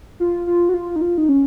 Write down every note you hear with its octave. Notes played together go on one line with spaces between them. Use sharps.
F4
F4
F#4
F4
D#4
F4
D#4
C#4